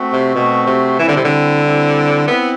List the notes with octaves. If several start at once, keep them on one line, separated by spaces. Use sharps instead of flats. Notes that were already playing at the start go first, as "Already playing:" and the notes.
Already playing: A3 C4 F#4
C3
B2 A3 C4 F#4
C3
E3 G3 C4 E4
D3
C3
D3
G3 C4 E4
B3 C4 E4 B4